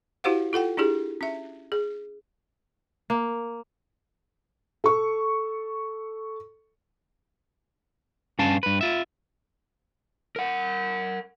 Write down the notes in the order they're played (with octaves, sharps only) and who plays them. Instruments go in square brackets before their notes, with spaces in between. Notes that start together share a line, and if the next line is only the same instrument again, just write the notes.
[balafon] E4 F#4 G4 C5 F5 F#5
F4 A4 F#5 G5
D4 E4 G4 G#4
C#4 E5
G#4
[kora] A#3
[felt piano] A4 C#6
[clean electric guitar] G2 C#4 F5 A5
G2 B4
F4 E5
[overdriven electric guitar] A#4 F#5